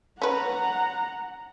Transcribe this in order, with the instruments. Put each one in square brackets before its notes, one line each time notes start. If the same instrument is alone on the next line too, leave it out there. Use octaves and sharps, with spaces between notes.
[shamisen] C#4 B4 [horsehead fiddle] F#5 A#5